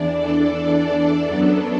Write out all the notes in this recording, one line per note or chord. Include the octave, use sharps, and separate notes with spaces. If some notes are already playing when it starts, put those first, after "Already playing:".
Already playing: E2 E3 D4 D5
A4
F#2 F#3 B3 D4 A4